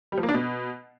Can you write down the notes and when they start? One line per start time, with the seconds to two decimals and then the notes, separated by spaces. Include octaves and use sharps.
0.12 G3
0.18 F3
0.23 A#3
0.29 D4
0.34 B2